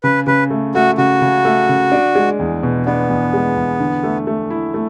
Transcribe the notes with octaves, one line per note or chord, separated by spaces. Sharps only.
C#3 B4
C#3 B4
A3
A3 F#4
C#3 F#4
C#3
A3
C#3
D4
G#3
E2
B2
B3 D4
E2
G#3
E2
D3
A3
A3
E4
A3